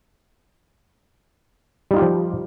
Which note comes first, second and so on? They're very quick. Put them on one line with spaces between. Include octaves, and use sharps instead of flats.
G3 D#4 F4 G4 F3